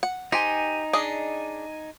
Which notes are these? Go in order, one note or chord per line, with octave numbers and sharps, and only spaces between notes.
F#5
D#4 G4 C5 G#5
D4 G#4 D#5